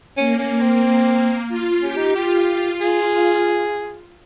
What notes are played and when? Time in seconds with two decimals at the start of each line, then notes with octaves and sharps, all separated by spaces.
0.17 A#3 C#4
0.39 C#4
0.61 C4
1.48 F4
1.82 C#4 G4
1.98 D#4
2.15 F4 G4
2.80 G#4